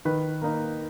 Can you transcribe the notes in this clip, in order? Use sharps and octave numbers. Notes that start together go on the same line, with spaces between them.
D#3 B4
A#3 D#4